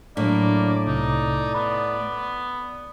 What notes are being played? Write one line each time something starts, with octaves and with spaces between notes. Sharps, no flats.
A2 F#3 A#3 D4 D5
C2 C3 D#4
B3 B5